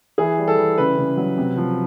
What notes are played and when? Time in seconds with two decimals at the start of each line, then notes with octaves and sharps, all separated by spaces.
0.18 E3 G#4
0.38 G3
0.48 A4
0.57 E3
0.78 C#3 B4
0.97 C#3
1.17 F#3
1.38 C3
1.57 F3